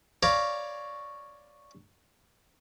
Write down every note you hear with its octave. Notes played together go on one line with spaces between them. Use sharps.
C#5 D5 F5 A#5 B5